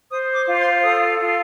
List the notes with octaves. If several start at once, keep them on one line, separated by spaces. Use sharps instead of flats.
C5 D#6
D6
F4
D6
C6
A4 D#6
F4